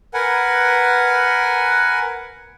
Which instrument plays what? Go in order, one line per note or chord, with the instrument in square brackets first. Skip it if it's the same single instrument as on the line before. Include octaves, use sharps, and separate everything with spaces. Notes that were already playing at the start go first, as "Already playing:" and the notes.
[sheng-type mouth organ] A#4 B4 F#5 G#5